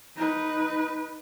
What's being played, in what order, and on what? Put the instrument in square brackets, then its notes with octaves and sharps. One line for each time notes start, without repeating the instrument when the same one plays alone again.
[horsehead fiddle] D#4 B4